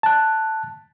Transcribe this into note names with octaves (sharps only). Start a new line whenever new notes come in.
A5 F#6